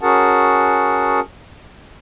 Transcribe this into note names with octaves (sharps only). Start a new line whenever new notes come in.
C#4 F#4 G#4 A#4 F#5 A5